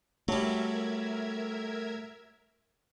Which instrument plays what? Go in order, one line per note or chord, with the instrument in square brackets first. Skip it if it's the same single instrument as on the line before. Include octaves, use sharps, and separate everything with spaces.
[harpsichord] F#3 G3 [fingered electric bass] A3 [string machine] A#4 E5 G#6